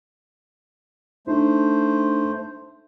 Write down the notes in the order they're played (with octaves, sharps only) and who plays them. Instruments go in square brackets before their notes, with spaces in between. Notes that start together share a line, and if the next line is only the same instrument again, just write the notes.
[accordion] A3 C5 [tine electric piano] D4 D#4